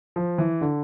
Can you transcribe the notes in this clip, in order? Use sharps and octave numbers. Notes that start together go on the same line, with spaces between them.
F3
E3
D3